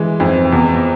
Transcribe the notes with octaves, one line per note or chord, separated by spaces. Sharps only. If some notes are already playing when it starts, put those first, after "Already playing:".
Already playing: E3 G#3
F2
E2